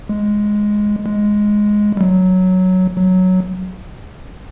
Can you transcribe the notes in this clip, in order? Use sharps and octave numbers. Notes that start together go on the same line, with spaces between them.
G#3
G#3
G3
F#3
F#3